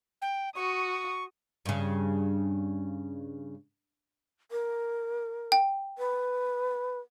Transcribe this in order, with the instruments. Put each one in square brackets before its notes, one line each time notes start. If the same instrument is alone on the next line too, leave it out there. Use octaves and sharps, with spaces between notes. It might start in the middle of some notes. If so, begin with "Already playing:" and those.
[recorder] G5
[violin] F#4 D#6 [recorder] C#6
[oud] G2 C#3
[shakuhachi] A#4
[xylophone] G5
[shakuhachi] B4